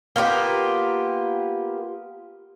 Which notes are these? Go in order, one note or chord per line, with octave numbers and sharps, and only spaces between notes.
A#3 B3 F4 G4